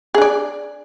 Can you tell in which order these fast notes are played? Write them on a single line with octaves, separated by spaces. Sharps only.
G#4 D4 D5